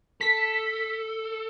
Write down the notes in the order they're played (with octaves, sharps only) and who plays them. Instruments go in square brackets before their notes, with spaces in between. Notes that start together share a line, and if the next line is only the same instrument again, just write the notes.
[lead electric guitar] A4 [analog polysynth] B6